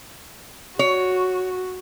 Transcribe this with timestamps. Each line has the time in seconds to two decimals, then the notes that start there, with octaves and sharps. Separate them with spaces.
0.79 F#4 C#5